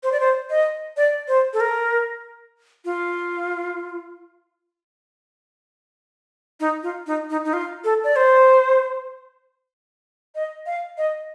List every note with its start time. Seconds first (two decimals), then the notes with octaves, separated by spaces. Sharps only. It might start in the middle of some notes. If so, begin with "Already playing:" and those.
0.03 C5
0.12 D5
0.20 C5
0.50 D#5
0.97 D5
1.28 C5
1.53 A4
1.60 A#4
2.85 F4
6.60 D#4
6.83 F4
7.07 D#4
7.30 D#4
7.45 D#4
7.53 F4
7.84 A4
8.04 D5
8.16 C5
10.35 D#5
10.66 F5
10.98 D#5